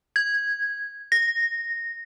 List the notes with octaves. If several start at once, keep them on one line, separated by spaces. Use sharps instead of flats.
G#6
A#6